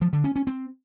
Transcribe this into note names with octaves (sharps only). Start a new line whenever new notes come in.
F3
D3
C#4
C#4
C4